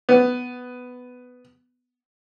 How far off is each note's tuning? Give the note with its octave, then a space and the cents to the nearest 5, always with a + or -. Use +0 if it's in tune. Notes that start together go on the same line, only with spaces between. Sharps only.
B3 +5